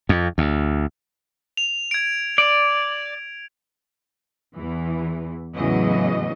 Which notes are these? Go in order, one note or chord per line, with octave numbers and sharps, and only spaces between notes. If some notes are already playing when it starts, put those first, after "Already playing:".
F2
D2
F7
G#6 D7
D5
E2 E3
E2 A2 C#3 E3 F#3 D#5